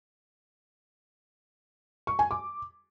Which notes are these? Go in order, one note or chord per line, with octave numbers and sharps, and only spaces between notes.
C#6
G#5
D6